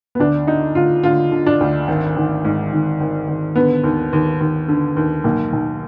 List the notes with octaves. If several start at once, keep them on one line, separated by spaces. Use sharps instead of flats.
B3
D2 D4
D3 D#4
D2 F4
D3 F4
D3
D4
D2
G#1
G#1
G#2
G#1
G#1
G#1
D3 B3
D#2
D#2
D#2
D3
D#2
B1 A#3
B1